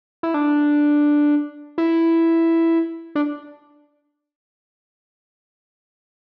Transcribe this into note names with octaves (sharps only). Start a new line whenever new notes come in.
E4
D4
E4
D4